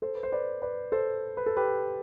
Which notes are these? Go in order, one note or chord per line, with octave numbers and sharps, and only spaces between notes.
A4 C5
B4
C5
B4 D5
B4 D5
A4 C5
B4
A4
G4 B4